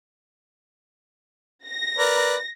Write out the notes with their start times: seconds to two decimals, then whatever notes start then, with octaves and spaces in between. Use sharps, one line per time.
1.68 A#6
1.98 A#4 B4 D5